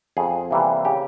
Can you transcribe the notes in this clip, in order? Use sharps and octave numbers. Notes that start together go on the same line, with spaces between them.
F2 G#4
C3 E3 G3 A#3
C#3 G4